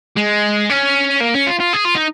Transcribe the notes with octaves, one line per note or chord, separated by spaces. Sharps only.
G#3
C#4
A#3
C#4
F4
F4
G#4
F4
D#4